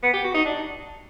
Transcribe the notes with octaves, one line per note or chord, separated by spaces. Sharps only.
B3
G4
F#4
D#4
D4